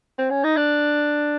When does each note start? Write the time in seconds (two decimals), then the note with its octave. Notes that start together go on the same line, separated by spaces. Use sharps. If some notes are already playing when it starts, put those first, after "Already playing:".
0.19 C4
0.31 C#4
0.44 D#4
0.57 D4